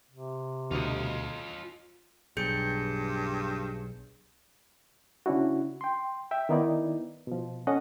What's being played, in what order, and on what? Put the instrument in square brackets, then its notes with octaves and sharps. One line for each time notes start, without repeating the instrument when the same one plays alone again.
[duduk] C3
[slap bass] D2 B2 [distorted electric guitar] F4 D#5
[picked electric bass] B1 [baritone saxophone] G2 [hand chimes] G#4 G6 C#7
[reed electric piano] C#3 C#4 D4 E4 F#4
G5 C6
E5 G5
D#3 B3 D#4 E4 D5
B2 F3
C#4 A4 D#5 F#5